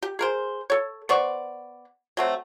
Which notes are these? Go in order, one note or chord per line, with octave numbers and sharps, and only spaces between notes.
G4
G#4 A#4 C5
A4 C#5
B3 C5 D5 C#6
F#3 A3 C4